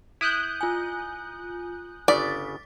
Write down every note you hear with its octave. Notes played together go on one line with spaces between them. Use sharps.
E4 D#6 F#6 G6
F4 G#5
G1 C#3 D5 D6 A6 B6